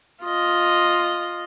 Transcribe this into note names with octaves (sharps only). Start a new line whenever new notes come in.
F4 D#5